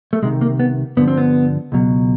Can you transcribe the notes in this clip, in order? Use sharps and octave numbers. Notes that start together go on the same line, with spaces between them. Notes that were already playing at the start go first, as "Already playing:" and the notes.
A3
C2 C3 D#3 G#3
A#3
B3
G2 D3 F3 B3
C4
B3
C#2 B2 F#3